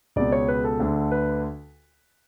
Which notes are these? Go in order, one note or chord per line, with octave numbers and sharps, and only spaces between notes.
C#2 B2 D5
C#5
B4
A4
D2 D3
B4